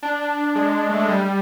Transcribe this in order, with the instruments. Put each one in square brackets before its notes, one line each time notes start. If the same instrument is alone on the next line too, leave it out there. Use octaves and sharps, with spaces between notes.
[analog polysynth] D4
G#3
A3
G#3
G3